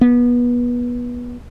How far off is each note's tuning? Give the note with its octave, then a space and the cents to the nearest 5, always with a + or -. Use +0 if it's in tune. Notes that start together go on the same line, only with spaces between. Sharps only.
B3 -25